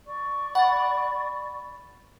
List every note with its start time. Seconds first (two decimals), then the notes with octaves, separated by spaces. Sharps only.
0.07 D5 C#6
0.55 F#5 B5 A6